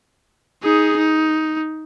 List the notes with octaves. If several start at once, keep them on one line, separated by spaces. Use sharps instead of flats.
D#4 G#4
D#4